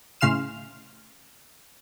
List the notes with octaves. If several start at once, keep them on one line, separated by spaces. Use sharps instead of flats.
A2 C#3 F5 C6 F6 E7